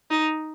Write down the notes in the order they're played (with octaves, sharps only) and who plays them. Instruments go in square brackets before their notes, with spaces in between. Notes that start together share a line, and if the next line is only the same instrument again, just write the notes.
[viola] D#4